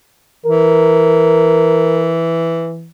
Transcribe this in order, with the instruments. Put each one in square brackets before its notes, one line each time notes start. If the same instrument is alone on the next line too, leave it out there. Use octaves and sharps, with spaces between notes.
[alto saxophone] E3 [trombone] A#4